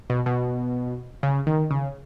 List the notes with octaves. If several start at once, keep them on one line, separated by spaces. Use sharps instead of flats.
B2
B2
C#3
D#3
C#3